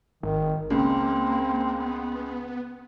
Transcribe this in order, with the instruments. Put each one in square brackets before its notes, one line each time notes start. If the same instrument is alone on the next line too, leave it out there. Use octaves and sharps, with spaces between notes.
[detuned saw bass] G#1 [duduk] D#3
[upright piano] C#2 [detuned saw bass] A#3 [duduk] C4
[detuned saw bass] B3